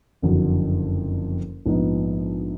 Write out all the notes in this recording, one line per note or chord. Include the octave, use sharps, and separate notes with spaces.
F#1 F2 D3 F#3
A#1 G#2 F3 B3 D#4